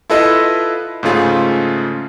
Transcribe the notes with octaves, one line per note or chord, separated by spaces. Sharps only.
E4 F4 A4 B4 D#5 F5
G#2 C#3 A3 F4 G#4